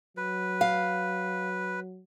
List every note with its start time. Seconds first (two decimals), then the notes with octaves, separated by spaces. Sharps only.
0.17 F#3 B4
0.61 F5